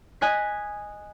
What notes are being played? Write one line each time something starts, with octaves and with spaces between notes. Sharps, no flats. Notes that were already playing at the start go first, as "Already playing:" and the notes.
D#5 G#5 F#6 B6